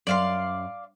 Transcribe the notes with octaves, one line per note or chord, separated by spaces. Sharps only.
F#2 D5 F5 C6